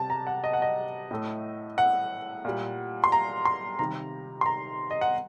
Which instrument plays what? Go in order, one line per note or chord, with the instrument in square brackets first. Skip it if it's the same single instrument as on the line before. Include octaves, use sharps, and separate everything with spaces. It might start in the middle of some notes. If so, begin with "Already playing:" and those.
Already playing: [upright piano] C3 G3 A5
A#5
F#5
D#5
F#5
D#5
A2 A3
F#5
A#2 G3
C6
A#5
C6
C3 D#3 G3 A#5
C6
A#5
D#5
F#5